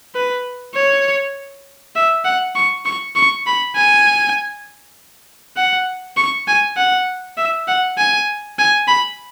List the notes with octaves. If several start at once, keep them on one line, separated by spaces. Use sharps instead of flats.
B4
C#5
E5
F#5
C#6
C#6
C#6
B5
G#5
F#5
C#6
G#5
F#5
E5
F#5
G#5
G#5
B5